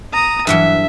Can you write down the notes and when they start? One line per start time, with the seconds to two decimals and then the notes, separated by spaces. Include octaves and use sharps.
0.13 A#5 D#6
0.47 G2 E3 F#3 E5